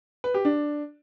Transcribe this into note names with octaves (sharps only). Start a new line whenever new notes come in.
B4
G4
D4